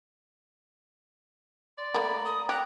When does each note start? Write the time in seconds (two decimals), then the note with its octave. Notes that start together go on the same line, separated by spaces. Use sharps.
1.78 D5 C6
1.94 A3 A#3 A#5 B5
2.25 D#6
2.49 G4 A#5 D6 F#6